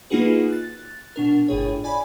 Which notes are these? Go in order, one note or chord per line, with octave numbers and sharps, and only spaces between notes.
A#3 D#4 F4 F#4 G#4 B4
F#6 A6
B2 D4 A#4
G1 A2 G#4 C#5
D5 G#5 B5